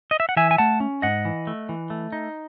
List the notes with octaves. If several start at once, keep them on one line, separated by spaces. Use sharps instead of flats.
D#5
E5
F#5
E3 E5 G#5
G#5
A3 F#5 A5
C#4
G#2 D#5 F#5
E3
A3
E3
A3
D#4